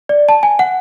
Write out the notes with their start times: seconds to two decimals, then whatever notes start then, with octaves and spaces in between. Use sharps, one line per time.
0.09 D5
0.29 A5
0.43 G#5
0.59 F#5